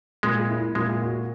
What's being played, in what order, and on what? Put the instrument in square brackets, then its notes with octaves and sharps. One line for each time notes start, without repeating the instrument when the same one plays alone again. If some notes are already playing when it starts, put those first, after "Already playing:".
[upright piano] A#2 [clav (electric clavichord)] G#3
[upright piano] E4
[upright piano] A#2 [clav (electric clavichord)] G#3
[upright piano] F#4